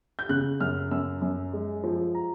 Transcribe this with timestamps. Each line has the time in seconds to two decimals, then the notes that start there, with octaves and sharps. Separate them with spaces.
0.19 G6
0.29 C#3 F#6
0.60 F#2 F6
0.91 F#2 E6
1.21 F#2
1.53 G#3
1.84 F3
2.15 A#5